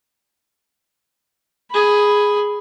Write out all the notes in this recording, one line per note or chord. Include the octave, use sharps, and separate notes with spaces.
G#4 B5